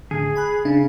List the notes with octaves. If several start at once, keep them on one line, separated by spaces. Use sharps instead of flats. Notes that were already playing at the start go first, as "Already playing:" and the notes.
A2 D3 G#4
G#5 B5 F#6
C#3 D4